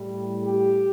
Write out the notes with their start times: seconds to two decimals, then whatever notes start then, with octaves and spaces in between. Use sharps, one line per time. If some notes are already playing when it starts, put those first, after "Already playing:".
Already playing: A2 G3
0.44 G4